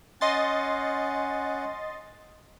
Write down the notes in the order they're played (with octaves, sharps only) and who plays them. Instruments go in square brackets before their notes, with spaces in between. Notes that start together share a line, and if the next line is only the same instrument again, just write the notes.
[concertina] C#4 F#5 [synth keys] D#5 C6 A6